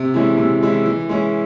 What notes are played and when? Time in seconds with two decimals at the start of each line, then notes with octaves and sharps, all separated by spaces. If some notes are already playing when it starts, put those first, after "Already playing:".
Already playing: C3
0.14 E3 G#3 C#4 E4
0.38 C3
0.62 E3 G#3 C#4 E4
0.86 E3
1.09 G#3 C#4 E4